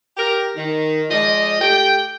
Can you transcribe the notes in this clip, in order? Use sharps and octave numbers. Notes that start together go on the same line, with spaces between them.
G4 A#4
D#3
F3 G#3 D5 D#5
A3 G4 G5